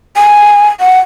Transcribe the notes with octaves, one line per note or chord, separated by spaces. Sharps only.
G#5
F#5